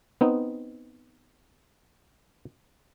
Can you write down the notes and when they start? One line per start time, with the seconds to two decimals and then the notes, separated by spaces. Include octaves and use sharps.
0.21 B3 C4 D#4